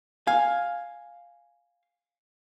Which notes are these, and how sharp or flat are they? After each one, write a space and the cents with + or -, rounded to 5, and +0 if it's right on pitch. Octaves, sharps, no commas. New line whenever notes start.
F5 +5 G#5 +0